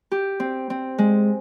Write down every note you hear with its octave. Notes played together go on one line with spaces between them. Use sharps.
G4
C4
C4
G#3